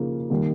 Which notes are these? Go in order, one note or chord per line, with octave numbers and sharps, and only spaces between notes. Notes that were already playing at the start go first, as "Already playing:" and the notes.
Already playing: C#3 F3 A#3 D#4
D#3 G3 A#3